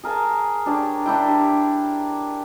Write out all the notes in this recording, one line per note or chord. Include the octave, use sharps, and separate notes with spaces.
G#4 A#4 G#5 A5
D4 G4 C#5
D4 E4 G5
G4